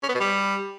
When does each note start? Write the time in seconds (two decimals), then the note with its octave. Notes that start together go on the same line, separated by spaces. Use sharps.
0.03 C#4
0.09 B3
0.14 B2
0.20 G3